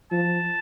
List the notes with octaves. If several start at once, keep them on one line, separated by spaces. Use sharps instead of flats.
F3 A5